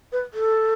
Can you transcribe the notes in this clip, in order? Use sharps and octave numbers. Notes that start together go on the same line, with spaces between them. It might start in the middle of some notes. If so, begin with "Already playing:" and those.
B4
A4